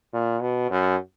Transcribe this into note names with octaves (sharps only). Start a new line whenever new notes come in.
A#2
B2
F#2